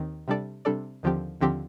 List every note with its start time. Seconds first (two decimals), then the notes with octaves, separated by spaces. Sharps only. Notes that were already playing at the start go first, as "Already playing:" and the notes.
Already playing: D#2 D#3 C4
0.28 C3 G3 D4 A4 D5
0.65 C3 G3 D4 A4 D5
1.03 D#2 D3 F3 C4 G4
1.41 D#2 D3 F3 C4 G4